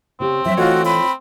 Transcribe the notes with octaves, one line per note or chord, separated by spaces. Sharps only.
C#3 C4 C#4 G4
F3 F#3 E5
E3 A3 F4 F#4 C#5 D#5
C4 B5